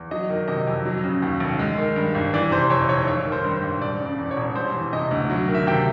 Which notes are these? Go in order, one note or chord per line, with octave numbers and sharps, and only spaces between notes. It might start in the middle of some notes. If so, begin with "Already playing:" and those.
Already playing: E2
F#3 D#5
D#3
C3 D#5
F2
F#3
C#3
D#2
F1
G#3
D#3
G2
G#1
E3 D5
C3 C5
F2 C#5
F1 C#5
G#1 C#5
D#3
C5
G2
C5
G#1
E1 D5
C#3
D5
E2
C#5
E1
G3 C5
E3
C3 D#5
D2
F#3
D#3
E5
C3 G5